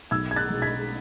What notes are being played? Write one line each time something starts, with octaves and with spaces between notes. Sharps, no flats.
B1 E6 G#6
G#6
F#6 A6
B2 G#3
G#6 B6